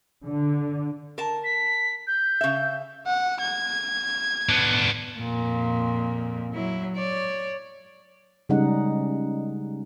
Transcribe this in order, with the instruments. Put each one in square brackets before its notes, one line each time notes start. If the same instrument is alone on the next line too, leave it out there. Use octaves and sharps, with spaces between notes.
[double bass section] D3
[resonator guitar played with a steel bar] A#4 A5
[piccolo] B6
G6
[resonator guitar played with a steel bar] C#3 E5
[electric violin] F#5
G#6
[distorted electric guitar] B3 D4
[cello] F2 A#2
F#3 E4
C#5 D5
[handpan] C#3 G3 G#3 C#4 D#4 F#5